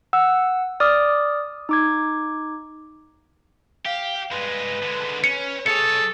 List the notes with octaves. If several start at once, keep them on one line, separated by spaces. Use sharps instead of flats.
F#5 E6
D5 D6 D#6 F6
D#4 D6 G#6
G4 F5
G2 G#3 B4
D3 G#3
C#4 C#7
B1 G#4 A4 C#5 C#7